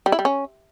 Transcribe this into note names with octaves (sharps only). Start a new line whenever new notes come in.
G3
E4
G3
C#4